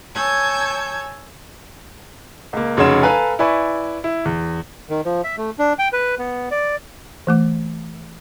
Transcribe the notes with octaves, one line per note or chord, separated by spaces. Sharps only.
C#5 G#5 A5 E6 G6 G#6
C#2 A#3
F1 C#3 F#4 C#5 C6 E7
A4 B4 F5 G#5 A#5
E4 B4 D5 G#5 B5 C#6
E4
E2
D#3
F3
E5
A3
D4
G5
B4
B3
D5
E3 A3 D6